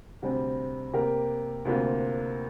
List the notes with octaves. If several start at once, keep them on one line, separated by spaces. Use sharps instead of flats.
D2 C3 G3 C4
C3 A#3 G4 A#4
D2 C3 A#3 F4